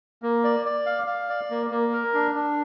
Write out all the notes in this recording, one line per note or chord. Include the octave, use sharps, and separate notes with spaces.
A#3
D5
D5
F5
F5
D5
A#3
A#3
A#4
D4
D4